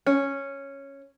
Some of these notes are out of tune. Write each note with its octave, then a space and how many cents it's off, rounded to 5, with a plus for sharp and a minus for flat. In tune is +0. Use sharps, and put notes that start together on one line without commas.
C#4 -5